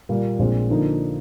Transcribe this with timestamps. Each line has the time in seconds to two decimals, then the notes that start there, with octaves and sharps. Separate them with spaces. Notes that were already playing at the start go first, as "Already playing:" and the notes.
0.09 A#2 G3 A#3 F4
0.39 A#1 A#2 G#3 C4
0.70 D3 F3 A#3 D#4